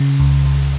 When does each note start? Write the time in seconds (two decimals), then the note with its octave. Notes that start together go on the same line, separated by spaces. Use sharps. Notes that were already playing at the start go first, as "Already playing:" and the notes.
Already playing: C#3
0.20 C#2
0.45 C#2